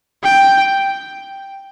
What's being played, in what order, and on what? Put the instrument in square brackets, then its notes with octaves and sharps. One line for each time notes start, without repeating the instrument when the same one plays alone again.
[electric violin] G5